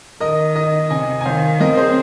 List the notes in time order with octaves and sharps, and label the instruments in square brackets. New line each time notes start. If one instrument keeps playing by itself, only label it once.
[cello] D#3 [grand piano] A#4 D#5
[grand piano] A#4 D#5
[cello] C3 [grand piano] D#5 G#5
[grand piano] G#5
[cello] D#3 [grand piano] C5 F5
[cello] C4 [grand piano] A#4 D#5
[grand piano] G#4 C5